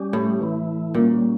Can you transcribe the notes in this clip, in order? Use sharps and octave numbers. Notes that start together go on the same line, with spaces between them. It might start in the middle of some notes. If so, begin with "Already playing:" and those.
Already playing: G3 C#4 G4
A2
E3 A3 E4
A#2 G3 A#3 C#4